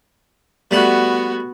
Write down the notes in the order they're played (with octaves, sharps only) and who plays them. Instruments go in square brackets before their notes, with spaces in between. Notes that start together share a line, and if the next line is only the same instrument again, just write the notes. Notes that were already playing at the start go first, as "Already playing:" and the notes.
[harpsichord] G3 A3 F#5 [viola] B3 F#4